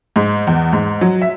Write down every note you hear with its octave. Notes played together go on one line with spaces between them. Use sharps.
G#2
E2
G#2
F#3
E5